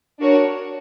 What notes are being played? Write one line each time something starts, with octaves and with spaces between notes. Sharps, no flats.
D4 F#4 A#4 C#5